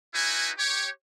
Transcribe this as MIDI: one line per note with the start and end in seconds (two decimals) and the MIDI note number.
0.14 0.49 63
0.14 0.49 64
0.14 0.49 66
0.14 0.49 71
0.14 0.49 80
0.58 0.88 67
0.58 0.88 73